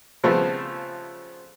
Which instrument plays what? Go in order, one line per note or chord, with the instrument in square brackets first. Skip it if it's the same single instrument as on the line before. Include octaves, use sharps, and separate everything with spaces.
[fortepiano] C#3 F3 G3 A3 B3 C4